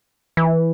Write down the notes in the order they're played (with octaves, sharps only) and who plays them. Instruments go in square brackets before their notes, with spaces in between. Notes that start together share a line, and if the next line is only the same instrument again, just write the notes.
[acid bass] E3